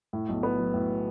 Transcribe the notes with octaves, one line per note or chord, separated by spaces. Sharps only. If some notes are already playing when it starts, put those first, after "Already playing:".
A2
B1
B3
F#3
A2